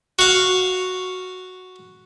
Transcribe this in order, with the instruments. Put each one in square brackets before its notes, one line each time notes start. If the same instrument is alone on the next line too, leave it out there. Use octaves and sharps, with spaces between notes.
[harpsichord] F#4 F5